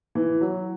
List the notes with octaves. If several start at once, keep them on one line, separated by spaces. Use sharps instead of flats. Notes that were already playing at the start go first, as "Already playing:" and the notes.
E3
F#3